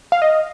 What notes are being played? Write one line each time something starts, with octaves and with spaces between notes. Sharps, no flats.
F5
D#5